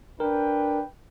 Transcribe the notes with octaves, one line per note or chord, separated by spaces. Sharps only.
D4 A#4 B4 G5